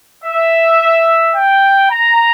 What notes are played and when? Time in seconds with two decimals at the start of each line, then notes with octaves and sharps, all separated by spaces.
0.23 E5
1.36 G5
1.92 A#5